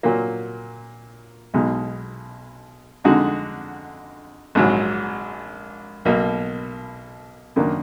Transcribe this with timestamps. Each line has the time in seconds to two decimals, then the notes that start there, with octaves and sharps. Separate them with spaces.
0.03 A#2 F#3 A#3
1.54 B1 B2 G#3 D#4
3.04 F2 D3 G#3 D#4 F#4
4.55 A#1 G#2 F#3
6.05 B1 B2 A#3
7.56 F#2 D#3 A#3 D4